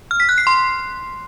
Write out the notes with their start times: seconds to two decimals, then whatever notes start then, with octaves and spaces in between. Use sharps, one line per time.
0.11 F6
0.20 B6
0.29 F#6
0.38 C7
0.47 C6